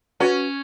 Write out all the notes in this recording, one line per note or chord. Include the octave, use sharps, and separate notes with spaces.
C#4 F#4 B4